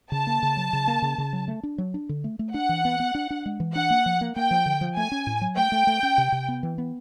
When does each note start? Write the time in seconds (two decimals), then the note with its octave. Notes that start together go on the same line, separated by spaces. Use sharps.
0.12 C#3 A5
0.27 A#3
0.43 C#3
0.57 F#3
0.73 C#3
0.87 A#3
1.02 C#3
1.18 C#3
1.33 F#3
1.48 A3
1.63 D4
1.78 F#3
1.94 D4
2.09 D3
2.24 A3
2.39 A3
2.54 D4 F#5
2.69 E3
2.85 B3
3.00 B3
3.15 D4
3.30 D4
3.46 G#3
3.60 E3
3.75 D4 F#5
3.90 A#3
4.06 F3
4.21 A#3
4.36 A#3 G5
4.51 F3
4.66 D3
4.81 F3
4.97 A3 G#5
5.12 C#4
5.27 A2
5.41 F#3
5.57 A3 G5
5.72 A3
5.87 A3
6.03 C#4
6.18 C3
6.32 C3
6.48 B3
6.63 E3
6.78 B3